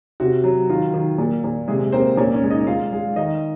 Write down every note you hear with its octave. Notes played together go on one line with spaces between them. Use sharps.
C3 F#4
F#3
D#3 F4
D#3
A#2
A#2
C3 G#3 G#4
A#3 C4 C5
A#2 C#4 C#5
C#4 C#5
G#3
D#4 D#5
G#3 F4 F5
G#3
D#3 D#4 D#5